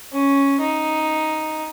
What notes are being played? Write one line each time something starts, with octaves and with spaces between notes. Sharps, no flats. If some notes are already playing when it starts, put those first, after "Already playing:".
C#4
D#4